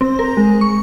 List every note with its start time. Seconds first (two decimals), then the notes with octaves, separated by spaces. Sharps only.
0.01 C4
0.19 A#4
0.37 G#3
0.61 C#6